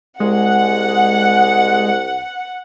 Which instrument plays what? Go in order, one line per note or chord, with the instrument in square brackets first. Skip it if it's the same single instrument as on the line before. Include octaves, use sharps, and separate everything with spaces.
[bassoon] C2 [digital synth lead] G#3 [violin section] F#5